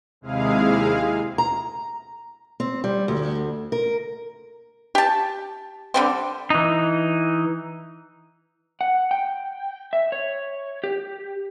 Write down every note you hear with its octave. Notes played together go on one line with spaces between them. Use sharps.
D#2 C3 G#3 E4 G#4 F5
A#5
C4
G3
D2
A#4
G4 A5
D3 G3 C4
E3 D#4
F#5
G5
E5
C#5
G4